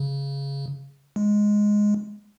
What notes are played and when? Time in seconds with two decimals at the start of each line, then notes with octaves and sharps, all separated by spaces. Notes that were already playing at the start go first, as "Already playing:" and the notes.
Already playing: C#3
1.16 G#3